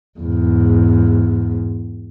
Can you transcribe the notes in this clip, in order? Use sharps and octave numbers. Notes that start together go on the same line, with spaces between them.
E2 G#2